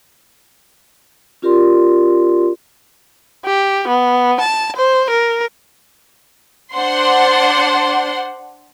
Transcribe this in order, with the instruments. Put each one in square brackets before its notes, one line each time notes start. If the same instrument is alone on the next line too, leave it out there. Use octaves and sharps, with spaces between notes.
[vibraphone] C#4 F4 G4 A#4 D5 C6
[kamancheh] G4
B3
A5
C5
A#4
[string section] D4 C5 F#5 C6